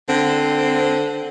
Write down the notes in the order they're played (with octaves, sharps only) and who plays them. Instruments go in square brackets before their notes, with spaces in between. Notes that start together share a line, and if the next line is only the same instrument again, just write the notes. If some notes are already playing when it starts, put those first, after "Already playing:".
[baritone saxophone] D3 [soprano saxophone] C4